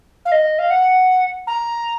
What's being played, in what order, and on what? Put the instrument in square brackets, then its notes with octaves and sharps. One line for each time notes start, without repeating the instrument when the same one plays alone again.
[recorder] F5
D#5
F5
F#5
A#5